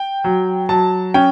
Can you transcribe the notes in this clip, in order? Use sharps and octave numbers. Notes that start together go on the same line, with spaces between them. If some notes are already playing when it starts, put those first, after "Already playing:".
Already playing: G5
F#3
F#3 A5
C#4 G5